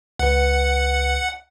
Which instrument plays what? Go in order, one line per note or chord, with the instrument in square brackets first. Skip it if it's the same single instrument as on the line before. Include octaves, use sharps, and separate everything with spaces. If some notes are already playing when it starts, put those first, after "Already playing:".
[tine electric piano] C#2 B4 [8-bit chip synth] F#5